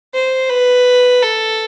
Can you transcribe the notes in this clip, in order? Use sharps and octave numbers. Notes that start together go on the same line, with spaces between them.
C5
B4
A4